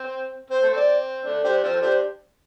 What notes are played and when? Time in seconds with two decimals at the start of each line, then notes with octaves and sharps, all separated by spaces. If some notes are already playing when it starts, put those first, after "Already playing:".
Already playing: C4
0.50 C4 C5
0.63 A3
0.73 C4 D5
1.25 A3 D4
1.44 D4 G4 C5
1.63 C4 F4 C5
1.73 A4
1.81 D4 G4 C5